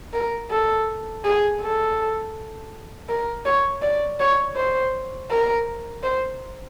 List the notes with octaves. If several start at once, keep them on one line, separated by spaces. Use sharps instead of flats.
A#4
A4
G#4
A4
A#4
C#5
D5
C#5
C5
A#4
C5